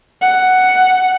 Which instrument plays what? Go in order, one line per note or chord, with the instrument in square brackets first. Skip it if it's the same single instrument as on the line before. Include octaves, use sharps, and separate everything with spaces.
[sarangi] F#5